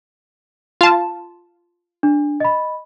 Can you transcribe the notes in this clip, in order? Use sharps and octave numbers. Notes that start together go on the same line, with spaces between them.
F4 A5
D4
D#5 B5